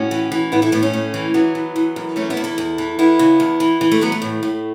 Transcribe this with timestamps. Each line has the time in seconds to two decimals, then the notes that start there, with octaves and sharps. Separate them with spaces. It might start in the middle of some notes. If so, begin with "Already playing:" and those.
Already playing: A2 C#4 F#4
0.11 E3
0.32 E3
0.52 A2 B3 E4
0.62 E4 A4
0.72 A2 B3 E4
0.83 A3 C#4
0.93 A2
1.14 E3
1.34 E3 F#3 B3
1.55 E3
1.76 E3
1.96 F#2
2.16 E3 A3 C#4
2.30 B3 E4
2.37 E2
2.44 E4 A4
2.58 E2
2.78 E3
2.99 E2 B3 E4
3.19 C#3
3.40 E2
3.60 E3
3.81 E3
3.92 A3
4.01 E3 F#3 B3
4.12 A3
4.22 A2
4.43 A2